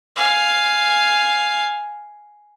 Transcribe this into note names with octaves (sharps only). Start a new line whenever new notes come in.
F5 G#5